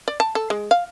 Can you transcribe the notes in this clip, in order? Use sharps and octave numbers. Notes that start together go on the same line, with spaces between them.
D5
A5
A4
G#3
F5